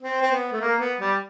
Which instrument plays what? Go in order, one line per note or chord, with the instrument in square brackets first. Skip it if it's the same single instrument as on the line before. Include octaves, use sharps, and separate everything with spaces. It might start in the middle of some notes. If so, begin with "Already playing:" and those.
[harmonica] C4
C4
B3
A3
A#3
B3
G3